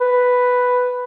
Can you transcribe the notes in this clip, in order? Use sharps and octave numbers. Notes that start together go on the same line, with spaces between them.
B4